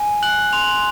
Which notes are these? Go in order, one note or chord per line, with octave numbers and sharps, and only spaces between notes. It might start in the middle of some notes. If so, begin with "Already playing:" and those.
Already playing: G#5
F#6 F#7
C6 F7